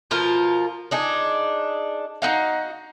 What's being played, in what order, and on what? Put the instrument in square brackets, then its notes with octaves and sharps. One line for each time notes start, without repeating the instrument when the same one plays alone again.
[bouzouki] B2 F3 F4 A#4
D4 D#4 G#4
D#4 F#4 F5